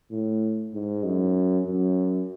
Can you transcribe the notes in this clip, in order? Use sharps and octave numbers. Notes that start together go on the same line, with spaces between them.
A2
G#2
F#2
F#2